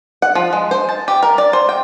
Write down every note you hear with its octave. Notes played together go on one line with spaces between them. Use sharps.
F#5
F3
G#3
C5
A5
G4
A#4
D5
C5
G5